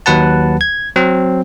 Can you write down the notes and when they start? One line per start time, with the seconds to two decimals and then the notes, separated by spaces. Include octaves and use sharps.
0.06 D#2 F#3 B4 F#5 A5
0.61 G#6
0.96 F#3 C4